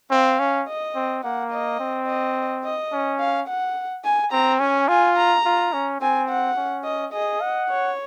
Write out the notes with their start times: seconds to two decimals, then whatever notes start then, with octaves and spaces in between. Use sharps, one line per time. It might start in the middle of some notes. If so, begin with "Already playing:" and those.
0.11 C4 F5
0.40 C#4
0.68 D#5
0.95 C4
1.23 A#3 F#5
1.51 D#5
1.80 C4
2.07 D#5
2.65 D#5
2.92 C#4
3.20 F5
3.48 F#5
4.05 G#5
4.32 C4 A#5
4.60 C#4 G#5
4.88 F4 G#5
5.17 A#5
5.45 F4
5.73 C#4
6.01 C4 G#5
6.29 F#5
6.57 C#4
6.85 D#5
7.13 G#4 D#5
7.42 F#5
7.70 C#5